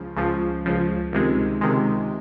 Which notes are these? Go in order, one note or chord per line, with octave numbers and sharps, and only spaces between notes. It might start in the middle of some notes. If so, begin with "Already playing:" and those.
Already playing: C#2 C#3 F3
C#2 C#3 F3
C#2 C#3 F3
C#2 C3 D#3 G#3
C#2 C3 D#3 G#3